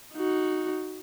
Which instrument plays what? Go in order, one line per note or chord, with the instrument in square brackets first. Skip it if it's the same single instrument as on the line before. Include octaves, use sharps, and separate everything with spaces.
[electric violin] D#4 F#4